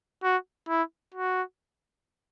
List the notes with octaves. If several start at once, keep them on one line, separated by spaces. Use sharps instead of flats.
F#4
E4
F#4